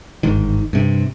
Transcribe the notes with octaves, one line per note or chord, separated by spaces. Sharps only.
G1 G#2 D#3
G2 C3